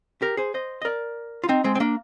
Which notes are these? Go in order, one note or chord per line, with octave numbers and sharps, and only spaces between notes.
G4 A#4
G#4 C5
C5 D#5
D#5
A#4 D5
F4
C4 D#4
G#3 C4
C4
A#3 D4